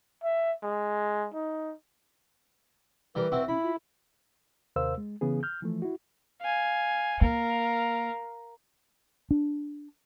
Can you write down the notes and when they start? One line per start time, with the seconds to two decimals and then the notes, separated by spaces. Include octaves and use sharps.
0.23 E5
0.63 G#3
1.34 D#4
3.15 E3 G3 A#4 B4
3.32 C4 E4 F#4
3.48 C#4 E4 B5
3.63 F4
4.76 D#2 C3 A#4 C5 F5 E6
4.98 G#3
5.21 C#3 E3 B3 G#4
5.43 F6 G6
5.63 E3 F3 A3
5.82 E4 F#4
6.42 F5 G#5
7.21 A#3 A#4 F5
9.31 D4